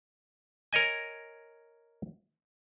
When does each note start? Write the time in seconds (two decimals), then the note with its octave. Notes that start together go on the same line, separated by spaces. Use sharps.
0.73 A#4 C#5 D#5 G#5